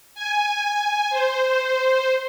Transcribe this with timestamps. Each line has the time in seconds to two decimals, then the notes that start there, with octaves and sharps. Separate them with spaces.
0.15 G#5
1.10 C5